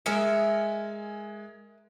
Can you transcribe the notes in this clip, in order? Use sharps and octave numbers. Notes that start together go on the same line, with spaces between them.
G#3 A#4 D#5 E5 G#5 C#7